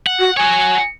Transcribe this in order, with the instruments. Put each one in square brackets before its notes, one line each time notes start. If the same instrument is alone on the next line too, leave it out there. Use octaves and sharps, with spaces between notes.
[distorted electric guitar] F#5
[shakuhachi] F#4
[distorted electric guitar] F#4 C#5 [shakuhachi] G#5